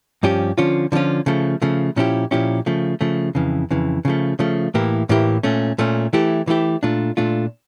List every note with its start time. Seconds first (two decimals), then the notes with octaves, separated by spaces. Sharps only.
0.23 G2 F3 C#4 G4
0.58 D3 F3 C#4 F4
0.92 D3 F3 C#4 F4
1.26 C#3 F3 A3
1.62 C#3 F3 A3
1.96 A#2 F3 C#4 E4 G4
2.31 A#2 F3 C#4 E4 G4
2.66 C#3 F3 A3
3.01 C#3 F3 A3
3.35 F2 C#3 E3
3.71 F2 C#3 E3
4.05 C#3 F3 A3
4.39 C#3 F3 A3
4.74 A2 E3 A#3 E4 G4
5.09 A2 E3 A#3 E4 G4
5.43 A#2 A3 C#4
5.78 A#2 A3 C#4
6.13 E3 A3 E4 G4
6.47 E3 A3 E4 G4
6.83 A#2 A3 D4 F4
7.17 A#2 A3 D4 F4